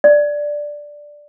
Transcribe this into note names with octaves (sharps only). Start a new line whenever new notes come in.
D5